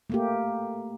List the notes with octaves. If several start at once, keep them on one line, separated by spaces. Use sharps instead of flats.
A3 A#3 G4